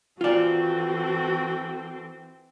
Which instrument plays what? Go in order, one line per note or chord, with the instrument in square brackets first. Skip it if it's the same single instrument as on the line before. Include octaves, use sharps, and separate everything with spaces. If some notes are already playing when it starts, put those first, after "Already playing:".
[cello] E3 C4 [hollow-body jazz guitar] F4 D5 [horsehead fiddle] F#4 A4